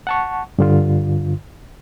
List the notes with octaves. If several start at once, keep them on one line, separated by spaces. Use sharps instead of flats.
F#5 A5 C#6
G2 D3 F4